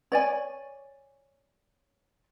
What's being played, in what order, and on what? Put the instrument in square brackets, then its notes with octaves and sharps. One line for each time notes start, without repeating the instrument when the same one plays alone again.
[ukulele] C#5 D5 G#5